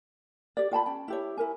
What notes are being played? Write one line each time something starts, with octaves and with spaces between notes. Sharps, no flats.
G4 D5
F4 G5 A5 B5
C#4 G5
E4 G4 C#5
E4 A#4 G#5